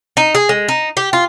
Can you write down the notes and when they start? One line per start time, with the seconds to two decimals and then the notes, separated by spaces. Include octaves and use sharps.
0.17 D#4
0.35 G#4
0.49 G#3
0.68 D#4
0.97 G4
1.13 F4